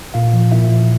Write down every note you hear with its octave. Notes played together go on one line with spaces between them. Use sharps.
A#2 F4 F5
F3
A#2 E4 E5
F3